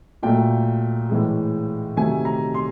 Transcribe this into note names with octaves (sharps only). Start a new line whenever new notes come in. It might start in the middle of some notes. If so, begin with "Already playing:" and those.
A#2 F#3 A3 G5
A2 E3 G#3
C3 D#3 F#3 A3 G#5
A#5
C6